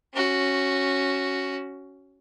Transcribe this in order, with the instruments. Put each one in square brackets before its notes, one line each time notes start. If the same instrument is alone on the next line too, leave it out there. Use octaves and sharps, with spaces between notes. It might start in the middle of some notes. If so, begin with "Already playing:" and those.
[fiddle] C#4 F#4